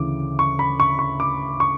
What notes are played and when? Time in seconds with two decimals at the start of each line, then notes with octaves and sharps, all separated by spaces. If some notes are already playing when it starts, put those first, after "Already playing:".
Already playing: D2 C#3 E3 D6
0.39 C#6
0.59 B5
0.80 C#6
0.99 C#6
1.20 D6
1.60 C#6